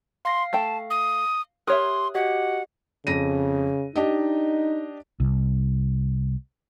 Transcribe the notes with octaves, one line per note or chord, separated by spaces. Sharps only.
F5 C6 A#6 C7
A3 G5 A5
D#6
G4 A#4 C#5 E5 C6 D#6 F#6
F#4 G4 D#5 F#5
F2 C#3 A#6 D#7
D4 D#4 G4 D#5
C2